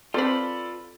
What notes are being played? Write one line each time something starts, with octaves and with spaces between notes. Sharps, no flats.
C4 F4 A4 B4 C5 D5 B5